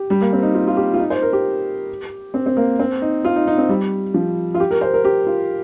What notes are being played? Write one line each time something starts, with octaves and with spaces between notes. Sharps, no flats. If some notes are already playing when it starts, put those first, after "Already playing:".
Already playing: G4
G3
A#3
C4
D#4
F4
F4
G4
F4
D#4
C5
A#4
G4
C4
C4
A#3
C4
D#4
F4
D#4
D#4
C4
G3
F3
F4
G4
A#4
C5
A#4
G4
F4